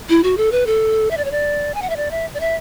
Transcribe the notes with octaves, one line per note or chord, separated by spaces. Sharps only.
E4
F#4
A4
B4
A4
E5
D5
C#5
D5
G#5
F#5
E5
D5
E5
D5
E5